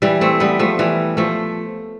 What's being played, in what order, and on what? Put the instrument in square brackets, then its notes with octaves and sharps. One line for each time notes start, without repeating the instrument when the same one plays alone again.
[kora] E3 G3
A3 C4
G3 B3
F3 A3
E3 G3
F3 A3